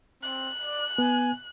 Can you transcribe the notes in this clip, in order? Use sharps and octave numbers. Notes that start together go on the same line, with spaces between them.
C4 F#6
D5
B3 G#5